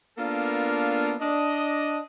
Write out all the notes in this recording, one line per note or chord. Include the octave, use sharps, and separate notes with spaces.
A#3 B3 D4 F4 A4 A#4
D4 D#5